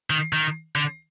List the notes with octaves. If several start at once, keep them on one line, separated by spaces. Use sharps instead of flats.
D#3
D#3
D3